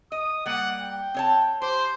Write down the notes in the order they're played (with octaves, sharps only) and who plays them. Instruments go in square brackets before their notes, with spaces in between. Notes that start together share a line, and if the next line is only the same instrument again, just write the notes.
[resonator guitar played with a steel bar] D#5 [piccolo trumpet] D#6
[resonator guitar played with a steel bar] G3 A#3 [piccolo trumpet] F#5
[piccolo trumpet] G5
[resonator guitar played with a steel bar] C4 C#5 A5
[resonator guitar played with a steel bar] G4 [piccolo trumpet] C5